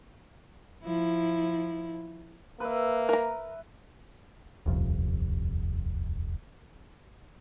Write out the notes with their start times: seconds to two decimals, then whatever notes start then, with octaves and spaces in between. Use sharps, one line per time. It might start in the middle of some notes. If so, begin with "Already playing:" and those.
0.83 F3 E4
2.60 A#3 B4 E5
3.09 A#4 A#5
4.66 D#1 C2 F2